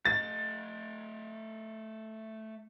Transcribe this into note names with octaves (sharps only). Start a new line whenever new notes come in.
A3 D#5 A6